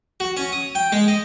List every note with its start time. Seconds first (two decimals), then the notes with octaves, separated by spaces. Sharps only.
0.20 F#4
0.37 C#4
0.52 D#6
0.75 G5
0.92 G#3
1.08 D#5